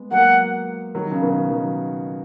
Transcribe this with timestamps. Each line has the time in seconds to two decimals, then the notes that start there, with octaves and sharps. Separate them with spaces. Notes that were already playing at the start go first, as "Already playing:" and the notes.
Already playing: G#3 B3
0.11 F#3 A#3 F#5
0.95 D#3 F#3
1.11 C#3
1.22 B2 D#3
1.50 D#3 F#3